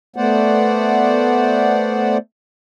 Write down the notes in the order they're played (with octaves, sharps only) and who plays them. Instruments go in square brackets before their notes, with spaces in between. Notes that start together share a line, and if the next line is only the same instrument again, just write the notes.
[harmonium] A3 B3 C5 D5 F#5